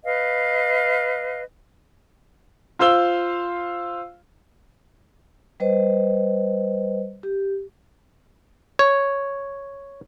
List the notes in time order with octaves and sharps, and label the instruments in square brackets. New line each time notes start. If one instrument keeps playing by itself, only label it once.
[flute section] B4 D#5 F5
[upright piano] F4 C5 F5 E6 G7
[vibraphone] G3 B4 C5 D#5
G4
[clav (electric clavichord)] C#5